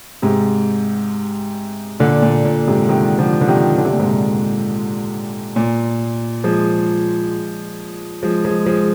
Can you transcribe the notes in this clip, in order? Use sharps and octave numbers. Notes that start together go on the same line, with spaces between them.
G#2 C3
A#2 D3
A#2
A#2
G#2 C3
C3 D#3
D3 F3
D3
C3 D#3
D3
C3
A#2
G#2 C3
A#2
F3 G#3
F3 G#3
F3 G#3
F3 G#3